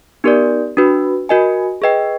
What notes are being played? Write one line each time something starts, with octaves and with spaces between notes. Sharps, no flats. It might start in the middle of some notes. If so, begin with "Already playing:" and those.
B3 D#4 G4 A#4 D5
D4 F#4 B4
F#4 A#4 D#5 G#5
G#4 B4 D#5 G5